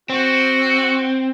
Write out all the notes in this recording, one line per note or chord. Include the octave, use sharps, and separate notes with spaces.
C4 F#4